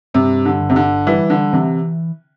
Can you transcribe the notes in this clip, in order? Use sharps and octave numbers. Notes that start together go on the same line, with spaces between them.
G2 C3
D3
G1
C3
D3
E3 G3
D3
C3 E3